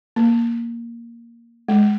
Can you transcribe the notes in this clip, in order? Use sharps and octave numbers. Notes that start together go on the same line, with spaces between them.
A#3
G#3